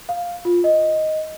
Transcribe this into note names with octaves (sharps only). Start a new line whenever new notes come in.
F5
F4
D#5